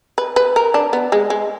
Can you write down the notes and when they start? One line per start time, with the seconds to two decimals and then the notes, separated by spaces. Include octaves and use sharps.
0.18 B4
0.36 B4
0.56 A#4
0.74 D4
0.93 B3
1.12 G#3
1.30 G#3